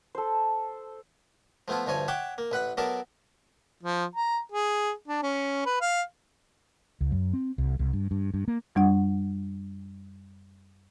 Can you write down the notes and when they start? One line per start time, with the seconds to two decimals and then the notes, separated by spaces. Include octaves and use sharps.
0.15 A4 C5
1.68 F3 A3 B3 E4 F4
1.87 D2 G2 F3 C#5 G#5
2.08 C#5 E5 F#5 G5 D6
2.38 A#3
2.52 A1 B4 F#5 B5
2.77 F#3 B3 A4 A#4 D5 E5
3.83 F3
4.16 A#5
4.52 G#4
5.08 D4
5.23 C#4
5.66 B4
5.81 F5
7.01 C#2
7.12 F#2
7.33 C4
7.58 C2
7.79 C2
7.93 G2
8.11 G2
8.34 G2
8.48 A#3
8.75 F#2 G3 D4 F#5